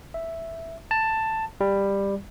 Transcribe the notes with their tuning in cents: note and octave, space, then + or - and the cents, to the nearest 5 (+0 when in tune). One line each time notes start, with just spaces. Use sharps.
E5 +0
A5 +10
G3 +15